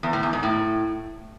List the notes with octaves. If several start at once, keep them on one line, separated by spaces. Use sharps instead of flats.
E2
A2
E2
G#2
A2